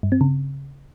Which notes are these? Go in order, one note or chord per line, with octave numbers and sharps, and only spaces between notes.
G2
C4
C#3